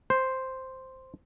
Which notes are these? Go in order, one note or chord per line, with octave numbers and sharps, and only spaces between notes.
C5